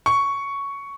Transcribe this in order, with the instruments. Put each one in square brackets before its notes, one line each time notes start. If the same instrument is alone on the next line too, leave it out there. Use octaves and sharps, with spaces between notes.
[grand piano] C#6